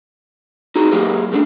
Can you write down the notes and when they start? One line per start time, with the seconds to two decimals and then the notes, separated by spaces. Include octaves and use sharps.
0.76 D#4 F#4 G#4 A#5
0.92 F#3 A#3 G4 G#4 B4
1.32 C2 G2 A3 C4 D4